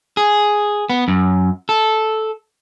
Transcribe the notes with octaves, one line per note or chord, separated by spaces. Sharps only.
G#4
B3
F#2
A4